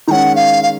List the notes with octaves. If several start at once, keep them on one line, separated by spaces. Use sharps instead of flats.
D#3 G#3 C#4 F#5 A#5
F5
F5